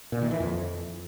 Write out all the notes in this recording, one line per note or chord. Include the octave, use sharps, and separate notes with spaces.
A#2
D#3
E3
F2